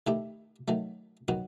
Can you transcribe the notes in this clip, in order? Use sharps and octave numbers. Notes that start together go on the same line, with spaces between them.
D#3 A3 E4 G4
D#3 F#3 A3
D#3 F#3 B3 F#4